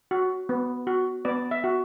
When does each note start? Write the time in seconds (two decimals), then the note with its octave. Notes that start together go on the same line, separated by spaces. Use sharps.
0.11 F#4
0.49 B3
0.87 F#4
1.25 B3 D5
1.51 E5
1.64 F#4